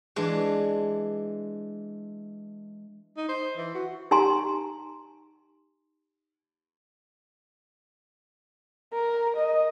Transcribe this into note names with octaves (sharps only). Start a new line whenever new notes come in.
E3 G#3 D4
D#4
C5
E3
F#4
D#4 G4 G#5 A#5 C6
A#4
D#5